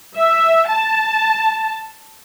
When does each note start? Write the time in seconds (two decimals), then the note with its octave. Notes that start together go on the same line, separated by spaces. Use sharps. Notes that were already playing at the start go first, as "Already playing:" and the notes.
0.17 E5
0.69 A5